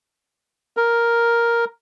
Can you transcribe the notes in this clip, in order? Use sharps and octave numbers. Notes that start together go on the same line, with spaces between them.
A#4